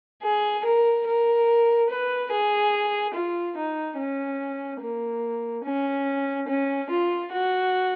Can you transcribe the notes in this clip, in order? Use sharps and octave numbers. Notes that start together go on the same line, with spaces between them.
G#4
A#4
A#4
B4
G#4
F4
D#4
C#4
A#3
C#4
C#4
F4
F#4